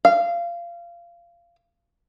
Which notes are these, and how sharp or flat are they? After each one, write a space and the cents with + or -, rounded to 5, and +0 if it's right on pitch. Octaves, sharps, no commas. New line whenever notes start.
F5 -20